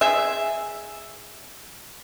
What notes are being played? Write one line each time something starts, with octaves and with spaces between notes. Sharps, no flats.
G#4 E5